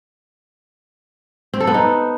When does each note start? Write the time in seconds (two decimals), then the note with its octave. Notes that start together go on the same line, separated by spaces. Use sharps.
1.54 C4
1.60 A4
1.67 B3
1.74 D#4